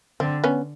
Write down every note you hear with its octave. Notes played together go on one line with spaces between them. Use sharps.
D3 C4
B3 C#4